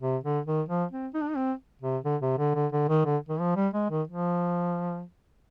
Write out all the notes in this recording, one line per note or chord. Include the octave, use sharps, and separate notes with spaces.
C3
D3
D#3
F3
C4
D#4
D4
D#4
C4
C3
D3
C3
D3
D3
D3
D#3
D3
D#3
F3
G3
G#3
D#3
F3